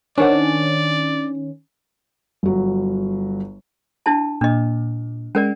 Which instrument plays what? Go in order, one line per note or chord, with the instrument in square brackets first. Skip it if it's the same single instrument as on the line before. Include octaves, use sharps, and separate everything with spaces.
[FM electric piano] D#3 C#4 [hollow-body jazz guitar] D4 C5 F#5 [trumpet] D5
[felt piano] G1 F#3
[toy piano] D4 E4 A5
[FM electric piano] A#2 [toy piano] D4 D#5
[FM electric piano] G#3 [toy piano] C#4 A#4 D5